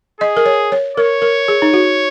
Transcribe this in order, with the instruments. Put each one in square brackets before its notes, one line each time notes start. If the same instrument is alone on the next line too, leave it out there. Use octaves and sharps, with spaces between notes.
[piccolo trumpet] G#4 [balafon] D#5
[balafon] A#4
C#5
C#5
[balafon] A#4 [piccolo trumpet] C#5
[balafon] A#4
G#4
D#4
F#4